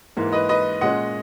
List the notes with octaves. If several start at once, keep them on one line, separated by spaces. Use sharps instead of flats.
G#2 E3 A#3
B4 D#5
B4 D#5
A#2 G#3 C#4 D#5 F#5